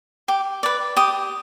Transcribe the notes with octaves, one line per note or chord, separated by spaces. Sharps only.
G4
B4 D5
G4 D#6